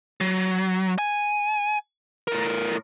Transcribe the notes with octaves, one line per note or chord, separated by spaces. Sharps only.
F#3
G#5
A2 A#4